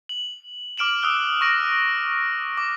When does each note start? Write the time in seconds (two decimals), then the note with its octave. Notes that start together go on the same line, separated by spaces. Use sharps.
0.09 F#7
0.78 D6 F6 D7 E7 F#7
1.02 D#6 E6 F#6 G7
1.41 C#6 A#6 D7
2.58 D6